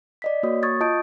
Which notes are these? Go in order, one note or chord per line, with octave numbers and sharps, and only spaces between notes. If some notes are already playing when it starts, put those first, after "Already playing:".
D5 D#5 B6
A#3 F#4 C#5 D#6
C#6 D#6 G#6 A6
F4 D#5 A5 D#6 G6 D7